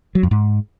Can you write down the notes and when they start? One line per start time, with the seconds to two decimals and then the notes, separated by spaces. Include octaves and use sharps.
0.15 F#3
0.23 F2
0.31 G#2